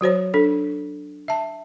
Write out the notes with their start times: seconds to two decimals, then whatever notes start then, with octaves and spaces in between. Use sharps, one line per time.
0.01 F#3 F#4 C5 C#5
0.34 D4 A4
1.28 E5 A5